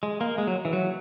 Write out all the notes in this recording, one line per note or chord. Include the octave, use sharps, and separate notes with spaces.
G#3
A#3
G#3
F#3
E3
F#3